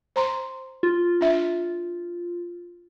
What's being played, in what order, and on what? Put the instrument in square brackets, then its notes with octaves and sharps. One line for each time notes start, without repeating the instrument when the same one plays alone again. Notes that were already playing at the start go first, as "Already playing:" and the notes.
[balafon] C5 A#5 C6
[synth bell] F4
[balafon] D4 E5